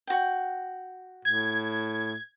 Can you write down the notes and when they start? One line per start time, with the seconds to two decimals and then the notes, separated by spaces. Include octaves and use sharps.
0.07 F#4 G5
1.25 A2 G#6